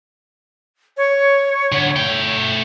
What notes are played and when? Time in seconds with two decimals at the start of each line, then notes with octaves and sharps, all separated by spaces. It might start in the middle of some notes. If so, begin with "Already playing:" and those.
0.97 C#5
1.72 D3 B3
1.96 A3 G5